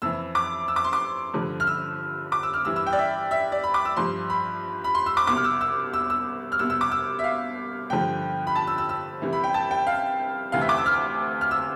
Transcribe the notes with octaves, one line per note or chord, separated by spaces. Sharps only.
F2 E3 E6
D6
E6
D6
C6
D6
G2 D3 F3
F6
E6
D6
E6
F6
G2 E3 E6
E6
G5
D5
E5
E5
D5
B5
D6
E6
G2 F3 C6
B5
B5
C6
E6
D6
C2 B2 D6
F6
E6
E6
E6
E6
F6
C2 B2 E6
E6
D6
E6
E5
F5
G2 D3 F3 G5
B5
A5
E6
E6
E6
C2 C3 E3
B5
G5
A5
G5
F5
D2 C3 E3 F5
E5
D6
E6
F6
F6
E6